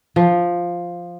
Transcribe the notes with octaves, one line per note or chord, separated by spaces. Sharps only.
F3